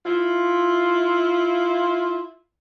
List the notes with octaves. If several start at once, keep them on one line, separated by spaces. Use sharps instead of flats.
E4 F4